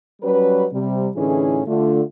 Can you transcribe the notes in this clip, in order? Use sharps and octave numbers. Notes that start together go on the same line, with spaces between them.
F#3 G3 C#4 B4
C3 G3
A2 D3 E3 C#4 D#4 G#4
D3 A3 F4